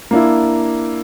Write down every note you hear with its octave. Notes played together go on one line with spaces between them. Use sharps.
A#3 D4 E4